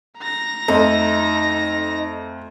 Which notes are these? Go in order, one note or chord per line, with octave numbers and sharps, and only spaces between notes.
A#5 A#6
F2 A3 D#4